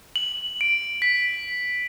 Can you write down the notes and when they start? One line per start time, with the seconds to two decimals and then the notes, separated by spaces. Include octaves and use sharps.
0.16 F#7
0.61 D7
1.02 B6